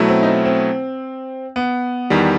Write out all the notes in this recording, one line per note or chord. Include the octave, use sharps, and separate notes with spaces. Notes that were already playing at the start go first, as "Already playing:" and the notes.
Already playing: B2 F#3 A3 E4
C4
D#4
C4
C4
B3
E2 D#3 G3